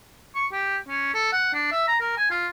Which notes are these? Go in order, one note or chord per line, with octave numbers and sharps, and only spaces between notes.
C#6
G4
C#4
A4
F#5
D4
E5
A#5
A#4
G#5
F4